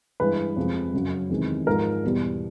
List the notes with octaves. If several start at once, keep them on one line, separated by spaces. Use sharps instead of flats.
G2 E3 G#3 B4
F2 C3 F3 G#3
F#2 C#3 F#3
E2 C3 D#3 G#3
G#2 F3 G#3 A#4
E2 B2 G3